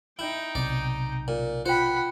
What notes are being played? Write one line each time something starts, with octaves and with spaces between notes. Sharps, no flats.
D#4 E4 G5
B1 C3 D5
A#2
F4 C5 F#5 G5 B5